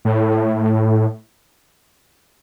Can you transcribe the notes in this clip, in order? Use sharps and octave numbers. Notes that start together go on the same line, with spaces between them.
A2